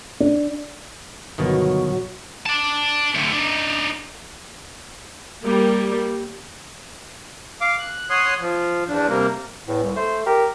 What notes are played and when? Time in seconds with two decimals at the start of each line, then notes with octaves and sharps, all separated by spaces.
0.20 D4
1.38 G1 B2 D#3 F#3
2.46 D5 A5
3.15 D2 A2
3.33 D4 D#4
5.42 G3 A#3
7.61 F5 D6
7.79 F#6
8.10 C#5 F#5 C6 D#6
8.41 F3
8.89 E2 D4
9.08 C3 G3 A#3
9.68 E2 A2
9.83 C2
9.96 A3 C5
10.26 G4 A#4